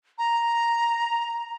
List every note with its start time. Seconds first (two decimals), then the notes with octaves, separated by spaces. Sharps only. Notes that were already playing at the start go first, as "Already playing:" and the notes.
0.18 A#5